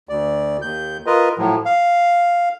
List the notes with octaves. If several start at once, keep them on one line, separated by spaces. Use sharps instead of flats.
D2 D5
D#2 G6
F4 A#4 B4 D#5
A2 F3 F#3
F5